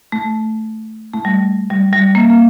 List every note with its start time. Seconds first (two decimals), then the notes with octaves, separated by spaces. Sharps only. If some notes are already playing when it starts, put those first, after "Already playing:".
0.12 A3
1.13 A3
1.25 G3
1.70 G3
1.93 G3
2.15 A#3
2.30 A#3